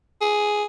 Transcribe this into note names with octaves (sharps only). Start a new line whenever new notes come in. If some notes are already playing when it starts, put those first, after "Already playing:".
G#4